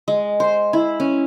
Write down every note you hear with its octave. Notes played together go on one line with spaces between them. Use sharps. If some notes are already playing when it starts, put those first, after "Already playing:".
G#3
C5
E4
C#4